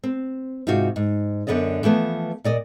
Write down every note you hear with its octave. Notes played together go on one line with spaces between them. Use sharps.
C4
G#2 C3 F4 F#4
G#2
F#2 D3 B3 D5 D#5
E3 F3 A3 B3
A#2 D5 D#5